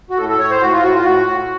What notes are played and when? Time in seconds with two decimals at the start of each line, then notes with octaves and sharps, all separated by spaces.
0.10 F#4
0.18 A2 A4
0.29 A4
0.39 A2 C#5
0.50 C5
0.61 A2 F#4
0.72 F4
0.83 A2 F#4
0.95 F4
1.04 A2 F#4
1.27 A2